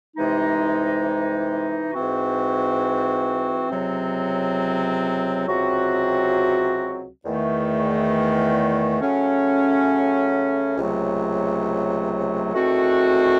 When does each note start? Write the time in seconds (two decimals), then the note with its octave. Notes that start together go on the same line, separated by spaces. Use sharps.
0.16 C2 C3 E3 G#3 D#4
1.93 G#2 E3 C4 F#4
3.70 C#2 C3 F#3 C4
5.47 C#2 C3 F#3 C4 F#4
7.24 E2 D#3 A3
9.00 C#3 F#3 A3 C#4
10.77 C#2 C3 F#3 A3
12.53 E2 D#3 A3 C4 F#4